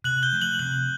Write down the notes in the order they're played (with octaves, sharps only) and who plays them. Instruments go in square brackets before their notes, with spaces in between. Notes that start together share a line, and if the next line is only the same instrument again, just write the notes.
[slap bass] C3 [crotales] F#6 F#7
[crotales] G6 G7
[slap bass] F3 A3
[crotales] F#6 F#7
[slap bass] C3 [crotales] F#6 F#7